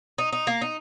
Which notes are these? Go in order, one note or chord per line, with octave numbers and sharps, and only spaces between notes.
D#4
D#4
A#3
D#4